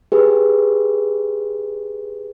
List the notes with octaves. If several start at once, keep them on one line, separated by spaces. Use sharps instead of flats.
G4 G#4 B4